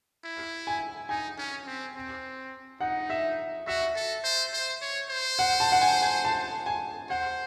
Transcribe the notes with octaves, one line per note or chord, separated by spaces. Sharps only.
E4
G#5
D#4 G#5
C#4
C4
C4
D#4 F#5
E5
F#4 E5
A4
C5
C5
C#5
C5
F#5
A5
F#5
G#5
G#5
A5
G#5
C5 F#5